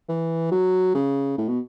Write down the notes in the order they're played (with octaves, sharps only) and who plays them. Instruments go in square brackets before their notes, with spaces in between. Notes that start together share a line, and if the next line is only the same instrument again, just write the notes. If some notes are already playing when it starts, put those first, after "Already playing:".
[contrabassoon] E3
F#3
C#3
A2
B2